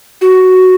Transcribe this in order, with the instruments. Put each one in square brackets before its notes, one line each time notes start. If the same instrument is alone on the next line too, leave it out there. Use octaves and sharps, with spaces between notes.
[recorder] F#4